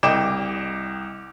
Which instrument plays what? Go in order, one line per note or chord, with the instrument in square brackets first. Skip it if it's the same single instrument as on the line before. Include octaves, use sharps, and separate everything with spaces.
[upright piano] C2 D#5 G5 D6 E7